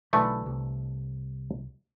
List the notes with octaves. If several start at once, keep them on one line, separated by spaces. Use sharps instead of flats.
B1 D3 E3 A3 B5
C2